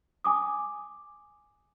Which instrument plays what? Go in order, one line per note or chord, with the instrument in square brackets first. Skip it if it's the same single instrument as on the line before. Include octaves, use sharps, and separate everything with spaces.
[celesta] G#5 D6 D#6